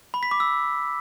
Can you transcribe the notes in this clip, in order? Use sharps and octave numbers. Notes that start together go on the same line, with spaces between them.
B5
B6
D6
E6